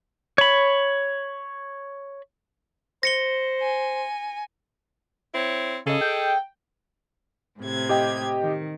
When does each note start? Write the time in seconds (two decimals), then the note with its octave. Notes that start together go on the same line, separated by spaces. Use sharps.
0.38 C#5 B5
3.03 C5 A#6 C#7 G7
3.61 G#5
5.33 C4 E4 C#5
5.86 C#3 G#4 A4 D#5
6.01 G5
7.60 A2 C3 G#6
7.89 G4 D#5 G5
8.41 D#3